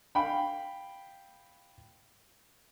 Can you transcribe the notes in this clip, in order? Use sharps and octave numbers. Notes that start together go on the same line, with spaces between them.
F5 G5 B5